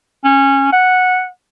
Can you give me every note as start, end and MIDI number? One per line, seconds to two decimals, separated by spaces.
0.25 0.71 61
0.73 1.26 78